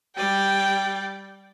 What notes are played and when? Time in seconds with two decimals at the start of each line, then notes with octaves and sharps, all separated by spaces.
0.17 G3 D5 G5